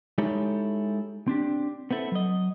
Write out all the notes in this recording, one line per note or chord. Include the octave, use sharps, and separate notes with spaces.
G#3 D#4 E4 G4 A4 C#5
C4 D4 G4
B3 C4 E4 A4
F#3 D#5